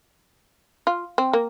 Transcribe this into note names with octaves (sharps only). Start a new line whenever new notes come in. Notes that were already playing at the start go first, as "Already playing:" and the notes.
F4
C4
A#3